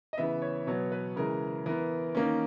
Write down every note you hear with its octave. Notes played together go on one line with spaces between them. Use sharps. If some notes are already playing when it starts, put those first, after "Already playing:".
D#5
C#3 E3 B3 E5
C#5
B2 F#3 B3 C#5
B4
C#3 E3 G#3 A#4
E3 B3 A#4
D#3 A#3 C#4